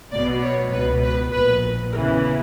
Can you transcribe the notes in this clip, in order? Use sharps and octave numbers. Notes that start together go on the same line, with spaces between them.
B1 B2 D5
C#5
C#2 B2 B4
B4
A#1 A#2 B4
E2 C#3 E3 A#4